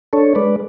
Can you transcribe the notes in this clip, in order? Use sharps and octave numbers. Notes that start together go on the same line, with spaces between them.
D4 A4 C#5
G#3 B4 D5